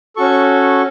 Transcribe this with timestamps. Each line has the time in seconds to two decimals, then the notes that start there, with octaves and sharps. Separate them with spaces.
0.16 C#4 F#4 A4 C#6